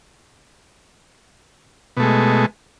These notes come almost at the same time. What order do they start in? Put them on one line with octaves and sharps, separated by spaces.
B2 A3 G#3